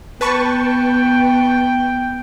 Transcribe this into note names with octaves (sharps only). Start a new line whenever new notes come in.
B3 B4 G5 A5 C#6